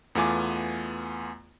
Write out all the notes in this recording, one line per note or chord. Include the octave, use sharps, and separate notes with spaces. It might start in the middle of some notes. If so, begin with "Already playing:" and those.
E2 A3 B3 F4 G#5 D6